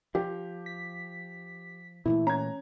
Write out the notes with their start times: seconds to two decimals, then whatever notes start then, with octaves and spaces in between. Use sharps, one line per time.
0.15 F3 G4
0.66 B6
2.06 A#2 E3 A3 E4
2.27 C#4 A#5 G#6